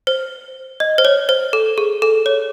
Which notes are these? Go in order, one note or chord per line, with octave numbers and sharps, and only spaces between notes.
C5
D#5
C5
C#5
C5
A4
G#4
A4
C#5